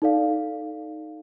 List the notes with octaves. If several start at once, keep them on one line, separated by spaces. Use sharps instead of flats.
D#4 A4 D5 F5